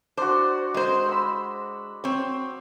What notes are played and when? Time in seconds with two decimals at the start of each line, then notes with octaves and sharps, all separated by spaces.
0.17 D4 F#4 C5
0.74 G#3 C5
1.09 B5 E6
2.04 C4 C#5